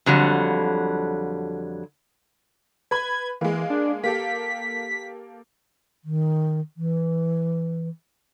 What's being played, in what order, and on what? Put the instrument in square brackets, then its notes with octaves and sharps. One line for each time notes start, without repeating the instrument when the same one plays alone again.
[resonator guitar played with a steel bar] F2 D3 F#3 G3
[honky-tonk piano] B4 B5 [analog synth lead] G#6
[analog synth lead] E3 [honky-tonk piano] G#3 A#3
[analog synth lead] D4
[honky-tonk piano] A#3 G4 A4 [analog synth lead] B6
[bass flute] D#3
E3